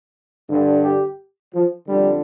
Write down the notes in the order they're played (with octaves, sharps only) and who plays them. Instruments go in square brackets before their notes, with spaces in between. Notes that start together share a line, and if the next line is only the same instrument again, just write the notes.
[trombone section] G2 D3
G4
F3
F2 D3 G3